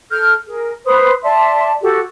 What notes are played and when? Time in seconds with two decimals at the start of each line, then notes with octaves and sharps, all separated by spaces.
0.11 A4 F6 G6
0.49 G#4 A#4
0.86 B4 C5 C6 D#6
1.24 D5 E5 A5 C6
1.82 F#4 G4 A4